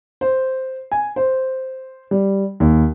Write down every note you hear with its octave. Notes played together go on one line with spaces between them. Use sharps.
C5
G#5
C5
G3
D#2